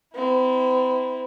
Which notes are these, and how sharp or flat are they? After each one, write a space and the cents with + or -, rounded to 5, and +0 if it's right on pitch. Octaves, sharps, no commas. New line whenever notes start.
C4 -35 E4 -20